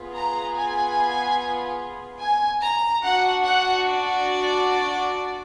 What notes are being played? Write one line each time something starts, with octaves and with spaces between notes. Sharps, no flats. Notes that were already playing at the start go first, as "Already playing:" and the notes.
Already playing: B3 F4 G#4
A#5
G#5
G#5
A#5
D4 F#4 F#5
F#5
D5